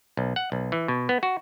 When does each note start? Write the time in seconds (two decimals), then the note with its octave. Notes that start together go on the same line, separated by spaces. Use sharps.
0.17 B1
0.36 F#5
0.52 B1
0.72 E3
0.88 B2
1.09 B3
1.23 F#4